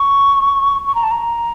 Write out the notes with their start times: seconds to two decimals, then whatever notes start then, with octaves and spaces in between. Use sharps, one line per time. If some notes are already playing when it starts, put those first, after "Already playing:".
Already playing: C#6
0.87 C#6
0.95 A#5
1.03 A5
1.11 A#5